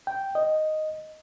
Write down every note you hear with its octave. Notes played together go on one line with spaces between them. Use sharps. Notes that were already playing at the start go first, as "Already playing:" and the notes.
G5
D#5